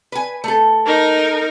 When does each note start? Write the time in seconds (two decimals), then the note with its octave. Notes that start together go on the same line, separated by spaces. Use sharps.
0.12 B4 G#5
0.44 A3 A4
0.86 D#4 A#4